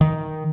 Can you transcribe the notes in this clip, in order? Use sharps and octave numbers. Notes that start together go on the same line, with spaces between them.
D#3